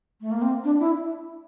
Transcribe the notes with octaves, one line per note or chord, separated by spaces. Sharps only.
A3
A#3
C4
D4
E4